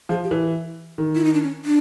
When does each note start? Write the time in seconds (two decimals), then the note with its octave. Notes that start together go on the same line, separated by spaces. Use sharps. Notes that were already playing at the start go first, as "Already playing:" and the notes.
0.09 F3 G#4
0.24 G4
0.31 E3
0.98 D#3
1.15 E4
1.24 D#4
1.33 D4
1.42 C#4
1.65 D4